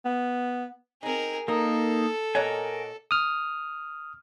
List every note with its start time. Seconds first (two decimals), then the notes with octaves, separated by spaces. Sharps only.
0.05 B3
1.03 C4 D#4 G#4 A#4
1.48 A#3 D#4 A4 A#4
2.35 A#2 A#4 C#5 D#5 F#5 G#5
3.11 D#6 F6